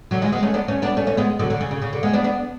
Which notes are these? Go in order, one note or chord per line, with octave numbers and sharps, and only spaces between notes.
D3 F#3
E3 G#3
G#3 B3
A3 C#4
B3 D4
A3 C#4
B3 D4
A3 C#4
A3 C#4
G#3 B3
D3 F#3
D3
C#3
C#3
C#3
D3
G#3 B3
B3 D4
B3 D4